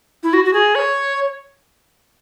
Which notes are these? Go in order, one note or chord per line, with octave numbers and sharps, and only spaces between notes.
E4
F#4
F#4
G#4
C#5